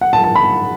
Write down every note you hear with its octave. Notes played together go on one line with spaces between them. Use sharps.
F#5
A5
A5
B5